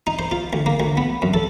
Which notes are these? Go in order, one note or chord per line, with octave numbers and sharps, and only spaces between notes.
D#4
C5
F4
D2
A#3
D2
B3
F#2
A4